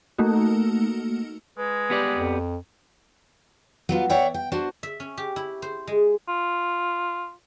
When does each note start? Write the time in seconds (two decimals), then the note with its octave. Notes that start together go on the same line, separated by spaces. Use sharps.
0.18 A3 A#3 D#4 F#4
1.58 G#3 B4
1.90 B3 G4 D5
2.15 F2
3.89 F#3 B3 F4
4.10 C#5 D5 E5 F#5 G5
4.34 G5
4.52 D4 F#4 C5
4.83 E5
5.00 C#4
5.17 G4
5.36 E4
5.62 C5
5.87 G#3
6.28 F4